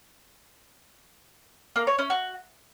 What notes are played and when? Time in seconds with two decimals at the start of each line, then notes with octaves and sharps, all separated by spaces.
1.76 A#3
1.87 C#5
1.99 C#4
2.10 F#4